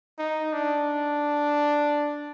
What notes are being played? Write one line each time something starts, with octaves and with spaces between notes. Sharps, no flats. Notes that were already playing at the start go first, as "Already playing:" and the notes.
D#4
D4